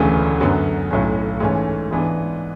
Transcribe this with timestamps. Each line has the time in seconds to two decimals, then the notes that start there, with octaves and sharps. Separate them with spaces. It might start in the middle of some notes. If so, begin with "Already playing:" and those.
Already playing: E1 D2 C#3 E3 A3
0.40 F#2 D3 F#3 B3
0.91 B1 A2 F#3 C#4
1.40 G#2 E3 A3 C#4
1.91 G#2 E3 B3 D4